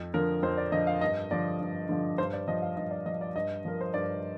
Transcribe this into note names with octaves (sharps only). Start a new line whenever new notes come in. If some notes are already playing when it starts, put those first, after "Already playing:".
Already playing: F2
D3 F3 A#4
F2 C5
D5
D3 F3 D#5
F5
G2 D#5
D3 F3 D5
G2
D3 F3
G2 C5
D5
F3 D#5
F5
G2 D#5
D5
F3 D#5
D5
G2 D#5
F3 A#4
C5
G2 D5